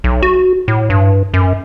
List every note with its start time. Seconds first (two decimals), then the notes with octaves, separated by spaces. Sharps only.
0.04 B1
0.22 F#4
0.68 A2
0.90 G2
1.34 F#2